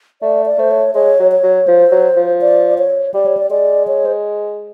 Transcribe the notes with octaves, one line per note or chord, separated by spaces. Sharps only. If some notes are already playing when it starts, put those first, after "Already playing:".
A3 D5
D5
A3 C5
C#5
G#3 C#5
F#3
C#5
F#3
F3 C5
F#3
F3
D5
C#5
G3 D5
C#5
D5
G#3 D5
C#5
C5